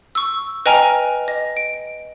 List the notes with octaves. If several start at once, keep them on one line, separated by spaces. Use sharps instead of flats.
C#6 E6
B4 D#5 G5 G#5 A#5 F6
D#5
D7